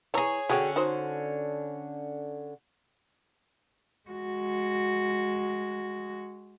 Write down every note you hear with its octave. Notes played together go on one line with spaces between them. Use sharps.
E3 G#4 C#5 A#5
D3 C#4 F#4 G#4 G5
D#4 F#4 C5
G#3 F#4